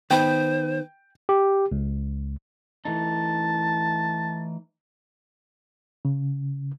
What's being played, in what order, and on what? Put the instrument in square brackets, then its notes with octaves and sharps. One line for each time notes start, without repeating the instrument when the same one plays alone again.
[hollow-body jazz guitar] D#3 B3 B4 [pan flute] C5 [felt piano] G5
[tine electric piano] G4
C#2
[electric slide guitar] E3 A3 D#4 [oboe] A5
[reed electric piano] C#3